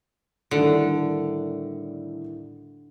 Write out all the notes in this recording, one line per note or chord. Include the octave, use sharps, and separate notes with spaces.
A2 D3 D#3 G3